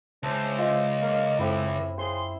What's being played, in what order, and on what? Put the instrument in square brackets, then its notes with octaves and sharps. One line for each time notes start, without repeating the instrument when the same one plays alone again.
[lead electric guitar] C#2 [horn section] C#4 E4 C5 [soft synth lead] A5
[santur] F4 [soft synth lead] D#5
[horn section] A#3
[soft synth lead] F#2 [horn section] A2 [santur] C4 E4
[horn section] C#3 G#4 C6 [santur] C5